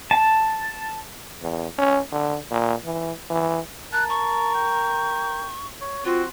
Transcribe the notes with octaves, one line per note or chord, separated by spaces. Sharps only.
A5
E2
C#4
D3
A#2
E3
E3
A#4 A5 F#6
C#6
G5
C#5
C4 F4 F#4